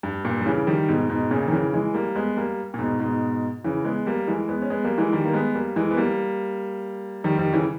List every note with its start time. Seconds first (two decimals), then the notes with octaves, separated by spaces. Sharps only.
0.03 G2
0.25 G2 A#2
0.41 G3
0.46 C#3 E3
0.67 D#3 G3
0.88 G#2 B2
1.10 G#2 B2
1.31 A#2 C#3
1.47 D#3
1.52 C#3 E3
1.73 E3 G#3
1.94 G3 A#3
2.15 G#3 B3
2.37 G3 A#3
2.74 A#2
2.79 G#2 B2
3.00 G#2 B2
3.64 C#3 E3
3.85 G#3 B3
4.07 G3 A#3
4.27 E3 G#3
4.49 G#3 B3
4.62 C#4
4.70 G#3 B3
4.84 G3 A#3
4.98 E3 G#3
5.13 D#3 G3
5.25 A#3
5.33 G#3 B3
5.55 G3 A#3
5.76 E3 G#3
5.91 B3
5.97 G3 A#3
7.24 D#3 G3
7.38 D#3 G3
7.53 C#3 E3